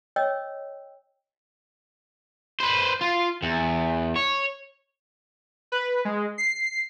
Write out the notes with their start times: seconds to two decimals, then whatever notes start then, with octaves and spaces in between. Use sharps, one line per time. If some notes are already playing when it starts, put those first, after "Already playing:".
0.16 C#5 D#5 G5 E6
2.60 B4 C5
3.01 F4
3.42 E2
4.16 C#5
5.72 B4
6.05 G#3
6.38 C7